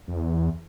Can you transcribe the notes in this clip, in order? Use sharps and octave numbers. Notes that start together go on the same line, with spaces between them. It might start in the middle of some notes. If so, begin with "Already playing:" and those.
F2
E2